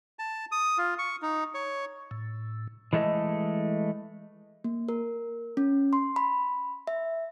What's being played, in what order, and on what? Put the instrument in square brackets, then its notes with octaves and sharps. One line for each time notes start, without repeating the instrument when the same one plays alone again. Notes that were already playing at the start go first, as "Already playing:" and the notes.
[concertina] A5
D#6
F4
C#6
D#4
C#5
[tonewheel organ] A2
[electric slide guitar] E3 G#3 A3 A4 D#5
[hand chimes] A#3
A#4
C#4
C6
B5
E5